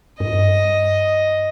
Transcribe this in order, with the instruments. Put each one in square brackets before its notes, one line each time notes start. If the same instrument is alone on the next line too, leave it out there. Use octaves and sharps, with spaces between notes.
[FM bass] G2 [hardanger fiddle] D#5